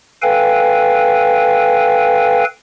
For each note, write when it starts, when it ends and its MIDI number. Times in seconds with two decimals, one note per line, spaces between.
0.22 2.44 69
0.22 2.44 71
0.22 2.44 77
0.22 2.44 79
0.22 2.44 80